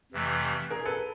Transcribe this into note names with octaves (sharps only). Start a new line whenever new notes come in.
F2 C3 E3 A3
G#4 A#4
A4 B4